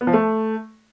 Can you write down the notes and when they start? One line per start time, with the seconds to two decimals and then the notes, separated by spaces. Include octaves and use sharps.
0.01 B3
0.07 F3
0.13 A3